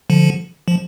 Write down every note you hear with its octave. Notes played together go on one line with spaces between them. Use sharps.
D3 F3
F3